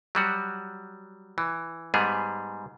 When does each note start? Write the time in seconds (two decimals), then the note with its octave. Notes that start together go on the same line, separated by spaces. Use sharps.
0.15 F#3 G3 F#4
1.38 E3
1.94 G#2 G3 B3 G#4